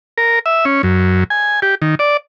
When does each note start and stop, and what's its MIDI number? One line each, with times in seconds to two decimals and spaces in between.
0.18 0.39 70
0.46 0.65 76
0.65 0.82 61
0.83 1.24 42
1.30 1.60 80
1.62 1.75 67
1.82 1.95 51
1.99 2.17 74